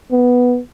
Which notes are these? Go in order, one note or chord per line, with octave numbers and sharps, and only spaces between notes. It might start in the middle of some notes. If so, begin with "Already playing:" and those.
B3